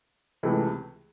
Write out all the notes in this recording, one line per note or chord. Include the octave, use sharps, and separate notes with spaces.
C#2 C3 E3 A3